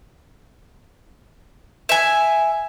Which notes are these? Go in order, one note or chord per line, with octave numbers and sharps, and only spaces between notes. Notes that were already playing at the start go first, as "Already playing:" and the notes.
E5 G#5